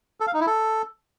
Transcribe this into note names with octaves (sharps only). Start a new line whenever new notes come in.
A4
F5
D#4
E4
A4